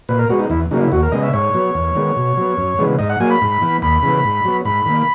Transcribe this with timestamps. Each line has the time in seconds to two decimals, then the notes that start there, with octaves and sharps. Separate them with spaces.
0.09 A#2 B4
0.19 A#4
0.30 G#3 B3 F#4
0.39 D#4
0.50 E2 E4
0.71 C#3 F#3 A#3 D#4
0.81 E4
0.92 D#2 F#4
1.03 A#4
1.12 C#3 G#3 B3 D#5
1.23 E5
1.33 G#2 C#5
1.54 F#3 B3
1.75 E2
1.95 D#3 G#3 B3
2.16 B2
2.37 F#3 B3
2.57 F#2
2.79 C#3 E3 G#3 B3
2.99 G#2 D#5
3.10 F#5
3.20 F#3 A#3 G#5
3.30 B5
3.41 G#2
3.62 E3 B3
3.82 D#2 B5
4.02 C#3 E3 B3
4.24 G#2
4.45 F#3 B3
4.65 G#2 B5
4.86 D#3 A#3